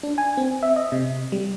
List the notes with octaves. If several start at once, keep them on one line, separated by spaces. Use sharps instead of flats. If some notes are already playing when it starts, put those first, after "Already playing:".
D4
G#5
C4
E5
D#5
C3
G3